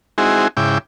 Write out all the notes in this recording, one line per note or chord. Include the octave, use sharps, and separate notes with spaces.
G#3 C4 D#4 E4 F#4 G#4
G#2 C#3 E4 G5 D6